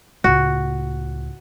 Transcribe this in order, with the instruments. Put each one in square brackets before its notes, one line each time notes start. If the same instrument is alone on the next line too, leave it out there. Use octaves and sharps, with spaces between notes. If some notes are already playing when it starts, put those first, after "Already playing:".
[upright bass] C#2 A2 [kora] F#4